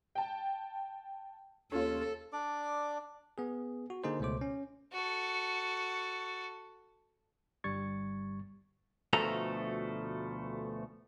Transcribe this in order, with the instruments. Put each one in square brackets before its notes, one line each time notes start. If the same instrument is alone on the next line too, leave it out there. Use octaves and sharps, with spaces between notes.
[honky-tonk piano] G5 A5
[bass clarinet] D#2 [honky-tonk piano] C#4 F4 [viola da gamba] A4
[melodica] D4 D5 D6
[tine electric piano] B3 G#4
F#4
D3 A#3 D#4 G#4 C5
C#2 B2 A3 C5 D6
C#4
[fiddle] F#4 A4
[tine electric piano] G1 G2 G3 C#6 G#6 A6
[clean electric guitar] D2 B2 F3 A3 A4 A#5